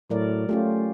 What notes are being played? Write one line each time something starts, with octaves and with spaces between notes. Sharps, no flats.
A2 F#3 A#4 D5
A3 C#4 F4 G4